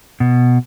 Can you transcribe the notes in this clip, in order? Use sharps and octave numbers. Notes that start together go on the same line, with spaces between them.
B2